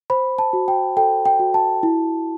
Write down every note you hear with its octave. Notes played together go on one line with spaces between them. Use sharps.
C5 B5
A5
F#4
G5
A4 G5
G5
F#4
A5
E4